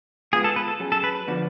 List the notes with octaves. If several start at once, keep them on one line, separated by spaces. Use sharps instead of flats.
G#3 B3 F4 G#4
A4
B4
A4
F#3 C#4 G#4
A4
B4
B4
D3 F3 B3 D4 F#4